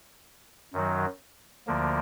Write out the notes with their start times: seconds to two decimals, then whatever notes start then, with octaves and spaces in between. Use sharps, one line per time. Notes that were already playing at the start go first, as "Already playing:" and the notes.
0.73 F#2 D#3 F#3
1.67 D2 D3 F3 A#3